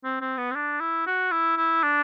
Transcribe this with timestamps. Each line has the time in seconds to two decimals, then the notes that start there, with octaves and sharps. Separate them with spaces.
0.04 C4
0.21 C4
0.38 B3
0.51 C4
0.55 D4
0.80 E4
1.07 F#4
1.31 E4
1.57 E4
1.83 D4